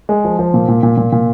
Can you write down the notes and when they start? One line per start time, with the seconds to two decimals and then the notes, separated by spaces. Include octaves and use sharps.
0.09 G#3
0.25 F3
0.39 F3
0.54 A#2
0.68 A#2
0.83 A#2
0.97 A#2
1.12 A#2